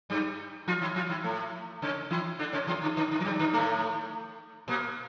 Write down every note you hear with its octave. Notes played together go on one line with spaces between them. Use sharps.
G2 G3
F3 F4
E3 E4
F3 F4
E3 E4
A2 A3
C#3 C#4
E3 E4
D3 D4
C#3 C#4
E2 E3
D3
D3
D3
F3
G2 G3
D3
A2 A3
A#2 A#3